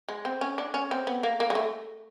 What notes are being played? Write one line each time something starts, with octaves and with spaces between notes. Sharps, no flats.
G#3
C4
C#4
D4
C#4
C4
B3
A#3
A#3
G#3
A3